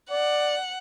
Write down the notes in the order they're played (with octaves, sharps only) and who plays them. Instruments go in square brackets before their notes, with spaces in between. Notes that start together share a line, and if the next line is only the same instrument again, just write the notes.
[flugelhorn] D5 [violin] F#5